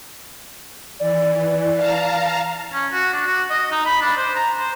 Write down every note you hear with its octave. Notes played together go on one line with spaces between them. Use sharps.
E3 D5
F5 A5 A#5
C#4
F#4
D4
F#4
D#5
D#4
B5
D4
C5
A#5
C5